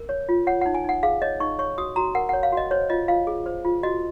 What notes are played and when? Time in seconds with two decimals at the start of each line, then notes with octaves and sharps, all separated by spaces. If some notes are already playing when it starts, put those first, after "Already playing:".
Already playing: A#4
0.09 C#5
0.29 F4
0.47 C#5 F#5
0.61 F#5
0.66 D#4
0.74 G#5
0.84 D#4 F#5
1.03 G#4 F5
1.22 C#5 D#5
1.40 D#4 C#6
1.59 C#5 C#6
1.78 F#4 D#6
1.96 F#4 A#5
2.15 A#4 F#5
2.29 F#5
2.33 C#5
2.43 F5
2.52 F#4 D#5
2.71 C5 C#5
2.90 F4 D#5
3.08 F4 F5
3.27 G#4
3.46 C5
3.65 F4
3.83 F#4 D#5